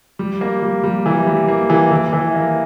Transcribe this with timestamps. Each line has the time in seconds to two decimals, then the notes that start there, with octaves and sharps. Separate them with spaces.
0.19 G3
0.41 A#3
0.63 G3
0.84 G3
1.06 E3
1.27 G3
1.48 A#3
1.70 E3
1.91 E3
2.13 E3
2.35 A#3